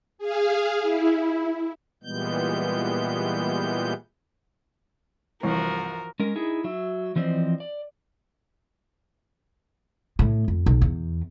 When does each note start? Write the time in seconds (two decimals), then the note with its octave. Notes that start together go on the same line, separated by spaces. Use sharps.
0.18 G#4 F5
0.82 E4
2.03 A#2 E3 G3 G#3 B3 G6
5.43 C2 G2 E3 F3 E4 F#4 A#4
6.20 G#3 C#4 A#4
6.36 D#4 E4 G#4
6.64 F#3 E5
7.16 E3 F3 C4 C5 D5 D#5
7.60 D5
10.19 A2
10.48 F2
10.66 B1
10.81 E2